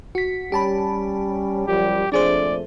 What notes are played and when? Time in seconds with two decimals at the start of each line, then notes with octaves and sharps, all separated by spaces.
0.15 F#4 B6
0.52 G3 C#4 G4 A5 B5
1.67 F#2 F3 G3 G4
2.12 A#1 F2 A3 D4 G#4 C5 D5